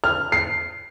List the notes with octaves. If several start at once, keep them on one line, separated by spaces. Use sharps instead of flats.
F6
C7